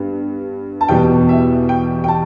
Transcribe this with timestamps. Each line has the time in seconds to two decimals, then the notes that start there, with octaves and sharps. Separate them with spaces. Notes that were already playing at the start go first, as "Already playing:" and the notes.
Already playing: G2 B3
0.81 A5
0.88 E2 B2 G3 B3 G5
1.29 E5
1.69 G5
2.04 G5
2.08 A5